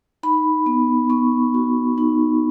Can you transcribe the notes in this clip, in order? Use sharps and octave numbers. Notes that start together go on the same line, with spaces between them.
D#4 B5
B3
B3 C#6
F#4
D#4